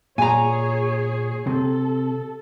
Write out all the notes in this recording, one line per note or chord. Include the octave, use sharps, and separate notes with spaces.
A#2 G#4 C#5 G#5 A#5
C3 A4